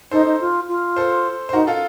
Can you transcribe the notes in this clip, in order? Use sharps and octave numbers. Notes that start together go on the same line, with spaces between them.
D#4 A4 C5
D#4
F4
F4
A4 C5
C5
D#4 F#4 A#4
F4 A4